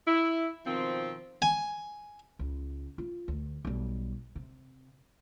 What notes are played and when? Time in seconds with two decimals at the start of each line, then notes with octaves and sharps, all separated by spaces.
0.07 E4
0.67 B2 D#3 F3 C4
1.42 G#5
2.39 C#2
2.98 F4
3.28 D2
3.65 B1 G3
4.35 C3